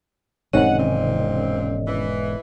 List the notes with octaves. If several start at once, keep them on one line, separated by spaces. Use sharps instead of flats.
E1 G#2 C3 D#3 F#3 C#4 D#5 F#5
A#2 C4
E3